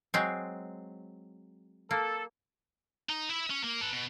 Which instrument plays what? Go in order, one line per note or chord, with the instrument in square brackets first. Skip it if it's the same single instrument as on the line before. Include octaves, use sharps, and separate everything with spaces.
[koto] F#3 G#3 C4
[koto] A#3 [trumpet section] A4
[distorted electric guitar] D#4
E4 E5
C#4
A#3
A4 B4
B2